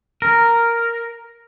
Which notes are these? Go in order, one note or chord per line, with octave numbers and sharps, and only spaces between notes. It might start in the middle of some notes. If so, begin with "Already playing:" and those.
A#4